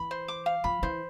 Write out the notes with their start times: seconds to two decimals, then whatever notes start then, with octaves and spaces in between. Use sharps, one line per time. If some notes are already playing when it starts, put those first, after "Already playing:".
Already playing: E3 B5
0.11 C5
0.28 D6
0.46 F5
0.64 F3 B5
0.83 E3 C5